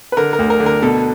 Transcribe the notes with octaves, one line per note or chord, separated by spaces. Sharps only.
B4
D3 A#4
A#4
D2
A#4
D3
A#4
B2 A4